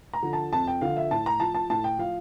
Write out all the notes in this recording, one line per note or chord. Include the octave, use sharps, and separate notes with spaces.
A#5
D3 F3
A5
F2 A5
G5
D3 F3 F5
E5
A2 A5
A#5
F3 A5
A5
A2 A5
G5
F3 F5